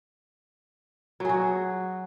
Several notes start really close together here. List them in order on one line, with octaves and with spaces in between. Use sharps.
F#3 G#4 F#4